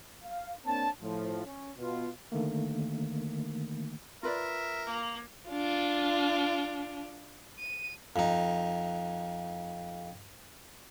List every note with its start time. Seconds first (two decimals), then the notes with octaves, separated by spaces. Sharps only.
0.23 F5
0.66 A#3 C4 D4 C#5 A5
1.02 A2 F3
1.45 C#4
1.78 B2 F4
2.32 D3 D#3 A3 A#3
4.23 F4 A#4 B4 D5 E5
4.87 A#3
5.50 D4 F4
7.59 D#7
8.16 F2 D#4